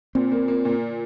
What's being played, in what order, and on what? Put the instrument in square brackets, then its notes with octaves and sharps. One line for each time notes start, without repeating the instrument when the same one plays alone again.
[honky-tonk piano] A#2 [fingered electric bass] C4
[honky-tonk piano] A#3
A#3
A#2